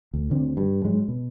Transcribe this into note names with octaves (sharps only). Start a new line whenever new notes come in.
D2
D2 D3 C4
G2
G#2 F#3 G#3
B2